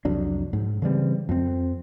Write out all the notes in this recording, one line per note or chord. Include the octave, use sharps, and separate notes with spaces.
C2 F2 F#3 D4
G#2
C#3 E3 G3 C4
F2 C4